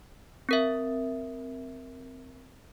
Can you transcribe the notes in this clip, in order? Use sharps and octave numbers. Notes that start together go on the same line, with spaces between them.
C4 A#4 E5